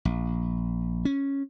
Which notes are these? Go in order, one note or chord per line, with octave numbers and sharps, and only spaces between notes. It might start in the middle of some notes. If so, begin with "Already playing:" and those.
A#1
C#4